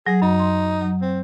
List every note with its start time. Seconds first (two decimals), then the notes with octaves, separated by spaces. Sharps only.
0.07 F#3 G#4
0.22 F#2 D#4
0.39 C6
0.81 F#3
1.02 C4